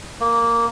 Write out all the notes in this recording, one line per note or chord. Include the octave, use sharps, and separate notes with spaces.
A#3